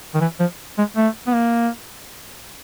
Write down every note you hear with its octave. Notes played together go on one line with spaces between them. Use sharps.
D#3
E3
F3
G#3
A3
B3
A#3